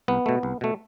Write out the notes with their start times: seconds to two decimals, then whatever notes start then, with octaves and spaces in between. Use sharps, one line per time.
0.08 C2 B3
0.26 B2 A3
0.43 C2
0.61 B2 A3